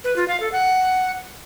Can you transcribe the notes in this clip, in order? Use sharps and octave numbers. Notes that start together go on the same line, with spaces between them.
B4
F4
F5
A4
F#5